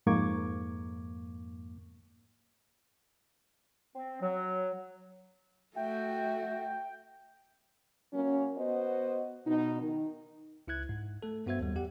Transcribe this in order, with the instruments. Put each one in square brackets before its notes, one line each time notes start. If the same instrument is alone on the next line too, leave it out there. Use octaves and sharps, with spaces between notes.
[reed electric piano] F2 G#2 A#3 C#6 D6 G#6
[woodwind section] C4
F#3
[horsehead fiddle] A3 F#4 [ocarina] E5 [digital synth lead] G5
[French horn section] F#3 A#3 C#4
B3 F#4 C5 D#5
B2 D#4
D#3
[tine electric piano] C#2 E4 E5 F#6 G#6
G#2
A3 A4
G2 B3 F#4 C5 E5 G#6
D#2 G3
E2 G4 F#5